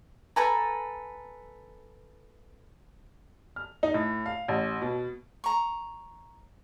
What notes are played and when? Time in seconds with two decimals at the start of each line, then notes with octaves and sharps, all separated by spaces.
0.36 A4 B4 G#5 A#5
3.56 F6
3.83 D#4
3.94 A2
4.26 F5
4.48 A1
4.82 B2
5.44 A#5 C#6